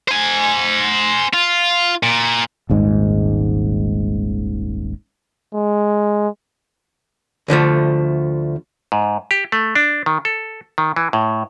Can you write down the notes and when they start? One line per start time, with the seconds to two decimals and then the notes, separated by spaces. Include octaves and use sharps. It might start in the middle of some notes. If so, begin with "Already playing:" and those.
0.08 C5 G#5
1.33 F4
2.03 A#2
2.70 D#1 G#1 G#2 G#3
5.54 G#3
7.48 D2 D3 F3 A3
8.92 G#2
9.31 G4
9.52 A3
9.75 D4
10.06 D#3
10.25 A4
10.78 D#3
10.96 E3
11.13 A2